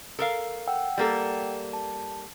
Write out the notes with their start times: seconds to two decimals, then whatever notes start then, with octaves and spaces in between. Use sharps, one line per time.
0.19 A4 A#4 F5
0.68 F#5 G5 E6
0.98 G3 A#3 A4
1.73 A5